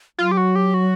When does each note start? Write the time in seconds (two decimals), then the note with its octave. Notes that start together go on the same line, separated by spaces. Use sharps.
0.18 F#3 F4
0.31 G4
0.37 F#4
0.56 G4
0.74 F#4